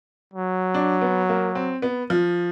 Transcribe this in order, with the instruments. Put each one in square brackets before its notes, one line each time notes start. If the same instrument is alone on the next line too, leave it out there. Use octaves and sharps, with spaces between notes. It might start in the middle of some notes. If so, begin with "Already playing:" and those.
[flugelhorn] F#3
[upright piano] D4
B3
A#3
C4
B3
F3